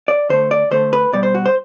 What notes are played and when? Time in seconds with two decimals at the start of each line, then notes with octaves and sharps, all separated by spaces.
0.08 D5
0.29 D3 A3 C5
0.51 D5
0.71 D3 A3 C5
0.93 B4
1.13 B2 G3 D5
1.23 C5
1.35 F#4
1.46 C5